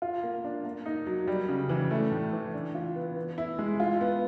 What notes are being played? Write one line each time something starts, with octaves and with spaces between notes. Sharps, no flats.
F4
A#3
D4
A#3
D#4
F#3
G3
C#3
E3
A3
A2
E3
D4
F4
B3
B3
E4
G#3
F4
B3